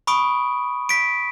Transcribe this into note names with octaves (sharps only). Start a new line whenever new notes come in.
B5 C#6 D#6 D7
B6 D7